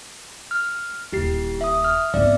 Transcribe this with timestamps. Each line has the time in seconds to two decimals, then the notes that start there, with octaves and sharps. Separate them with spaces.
0.51 F6
1.12 D#1 D#2 E4 G4 C7
1.61 E5 D#6
1.84 F6
2.14 G#2 B3 C4 D5 E5